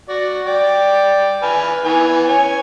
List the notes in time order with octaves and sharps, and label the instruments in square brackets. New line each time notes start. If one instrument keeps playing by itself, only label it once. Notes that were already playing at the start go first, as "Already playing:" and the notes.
[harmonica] F#4 D5
D5 G5
B4 G#5 F6
E3 B3 G#5
C#5 G#5